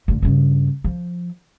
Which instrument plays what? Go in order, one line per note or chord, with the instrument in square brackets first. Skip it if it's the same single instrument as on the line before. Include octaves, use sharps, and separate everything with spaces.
[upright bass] D2 A#2
G2 C#3
F3